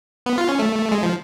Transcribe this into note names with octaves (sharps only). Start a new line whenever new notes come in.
B3
F4
C#4
A3
G#3
F3